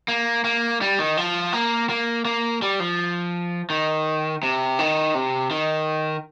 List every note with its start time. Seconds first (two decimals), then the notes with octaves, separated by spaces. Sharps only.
0.08 A#3
0.44 A#3
0.81 G3
0.99 D#3
1.17 F3
1.53 A#3
1.89 A#3
2.25 A#3
2.62 G3
2.80 F3
3.70 D#3
4.43 C3
4.79 D#3
5.15 C3
5.51 D#3